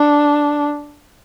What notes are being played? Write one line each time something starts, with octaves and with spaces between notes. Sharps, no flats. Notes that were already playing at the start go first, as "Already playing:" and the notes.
Already playing: D4